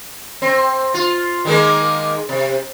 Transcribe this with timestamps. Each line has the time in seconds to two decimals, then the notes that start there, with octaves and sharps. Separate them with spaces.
0.42 C4
0.94 F4
1.45 D#3 G#3 A#3
2.29 C3